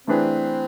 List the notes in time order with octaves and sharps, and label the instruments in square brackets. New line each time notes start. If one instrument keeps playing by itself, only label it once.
[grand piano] E3 A3 D4 G#4 B4 [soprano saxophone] C4